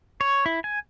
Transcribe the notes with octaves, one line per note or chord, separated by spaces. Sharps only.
C#5
E4
G#5